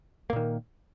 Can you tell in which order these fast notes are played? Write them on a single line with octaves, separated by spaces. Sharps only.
A#3 A#2 D#3